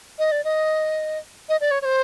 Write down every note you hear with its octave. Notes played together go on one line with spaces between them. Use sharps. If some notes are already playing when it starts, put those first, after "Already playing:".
D#5
D5
D#5
D#5
D5
C#5
C#5
C5